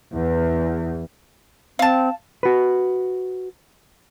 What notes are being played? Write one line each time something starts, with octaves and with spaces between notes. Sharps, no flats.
E2
C4 F5 A5
F#4 B4